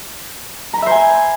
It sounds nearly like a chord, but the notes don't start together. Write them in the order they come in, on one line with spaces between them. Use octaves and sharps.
A#5 B5 E5 C5 G#5